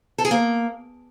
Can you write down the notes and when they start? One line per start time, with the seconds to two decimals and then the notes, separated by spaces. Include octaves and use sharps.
0.18 A4
0.25 G#4
0.31 A#3